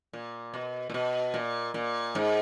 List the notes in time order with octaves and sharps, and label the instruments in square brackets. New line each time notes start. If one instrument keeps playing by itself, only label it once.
[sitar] A#2
B2
A#2
B2
A#2
A#2
G#2